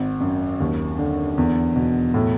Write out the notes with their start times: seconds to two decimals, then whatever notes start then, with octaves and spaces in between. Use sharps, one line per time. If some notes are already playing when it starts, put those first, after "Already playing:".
Already playing: G#1
0.20 F#2
0.60 D#2
0.98 D3
1.38 E2
1.76 B2
2.14 A2